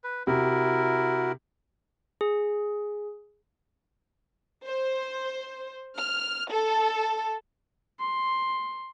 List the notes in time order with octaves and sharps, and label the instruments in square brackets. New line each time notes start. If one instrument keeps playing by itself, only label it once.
[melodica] B4
[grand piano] C3 [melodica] E4 A#4 [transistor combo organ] F#4
[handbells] G#4
[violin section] C5
F6
A4
[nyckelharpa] C6